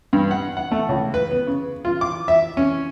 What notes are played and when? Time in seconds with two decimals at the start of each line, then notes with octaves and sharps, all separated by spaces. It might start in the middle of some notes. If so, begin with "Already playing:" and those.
0.13 G2
0.31 F#5
0.57 F#5
0.71 A3
0.89 C#2
1.14 B4
1.31 B3
1.47 C#3
1.85 F4
2.01 D6
2.28 E5
2.57 C#4